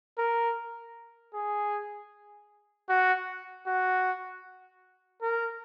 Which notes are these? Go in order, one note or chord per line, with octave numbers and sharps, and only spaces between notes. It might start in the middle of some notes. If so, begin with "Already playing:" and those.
A#4
G#4
F#4
F#4
A#4